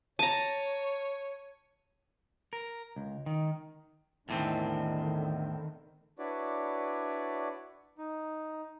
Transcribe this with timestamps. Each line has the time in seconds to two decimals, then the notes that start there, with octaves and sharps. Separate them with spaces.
0.19 C#5 A5 A#5 D#7
2.53 A#4
2.96 C#2
3.26 D#3
4.29 E2 A2 D3 D#3 C4
6.19 D4 E4 F#4 B4 C#5 D5
7.98 D#4